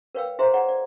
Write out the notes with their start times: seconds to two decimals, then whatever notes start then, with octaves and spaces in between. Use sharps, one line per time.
0.15 A#4 B4 C#5 F5 G5 E6
0.39 E4 G#4 C5 E5 A#5 C6
0.54 G#4 C#5 D5 F#5 A#5
0.69 D5